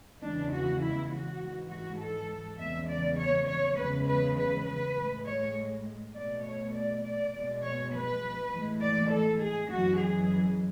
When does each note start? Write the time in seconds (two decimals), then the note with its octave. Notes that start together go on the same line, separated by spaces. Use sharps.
0.22 E2 C#3 E3 G#3 D4
0.52 F#4
0.82 E4
1.12 F#4
1.41 G#2 E3 G#3
1.70 F#4
2.00 A4
2.59 E2 C#3 G#3 E5
2.89 D5
3.18 C#5
3.48 C#5
3.78 E2 C#3 G#3 B4
4.07 B4
4.37 B4
4.67 B4
4.96 A2 G#3
5.25 C#5
6.15 B2 A3 D5
6.44 C#5
6.74 D5
7.04 D5
7.34 B2 G#3
7.63 C#5
7.93 B4
8.52 A2 E3 G#3
8.82 D5
9.11 A4
9.41 G#4
9.70 F#2 E3 G#3 F#4
10.00 G#4